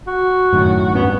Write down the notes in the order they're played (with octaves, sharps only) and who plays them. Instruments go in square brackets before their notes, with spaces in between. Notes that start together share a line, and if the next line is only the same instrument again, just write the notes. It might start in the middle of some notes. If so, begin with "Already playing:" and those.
[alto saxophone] F#4
[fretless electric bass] F#2 A2 D#3
[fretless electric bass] D1 G2 C#4 [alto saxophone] B3